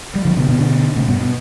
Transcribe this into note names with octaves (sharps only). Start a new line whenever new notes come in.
G3
D3 F3
B2 D3
B2 D3
B2 D3
A2 C3
G2 B2
B2